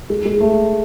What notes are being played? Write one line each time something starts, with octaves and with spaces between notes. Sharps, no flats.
G#3
G#3
A3